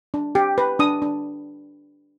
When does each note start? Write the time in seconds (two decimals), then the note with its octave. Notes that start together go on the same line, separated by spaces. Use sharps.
0.14 D4
0.35 G4
0.58 B4
0.79 D4 D#6
1.02 D4